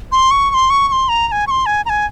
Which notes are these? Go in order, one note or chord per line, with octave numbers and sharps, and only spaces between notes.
C6
C#6
C#6
C6
C#6
C#6
C6
A#5
A#5
G#5
C#6
C6
G#5
A#5
G#5